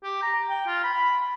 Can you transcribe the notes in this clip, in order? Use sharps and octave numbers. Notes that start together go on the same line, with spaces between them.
G4
A#5
G5
F4
B5